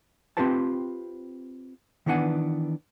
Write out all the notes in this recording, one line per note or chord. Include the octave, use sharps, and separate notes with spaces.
C4 F4 G4 B4 C5 A5
D#3 E3 B3 D4 F#5 G#5